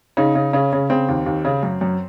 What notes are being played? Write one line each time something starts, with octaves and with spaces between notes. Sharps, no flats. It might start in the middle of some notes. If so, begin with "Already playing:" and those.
C#3 D#4
C#3
C#3 C#4
C#3
C#3 C4
D#2
D#2
C#3
F#2
F#2